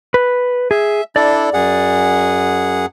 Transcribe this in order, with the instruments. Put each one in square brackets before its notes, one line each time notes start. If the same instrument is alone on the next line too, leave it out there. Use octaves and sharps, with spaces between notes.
[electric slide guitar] B4
[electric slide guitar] G#4 [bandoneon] E5
[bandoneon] D4 E4 A4 [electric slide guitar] D5
[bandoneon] F#2 G#4 F#5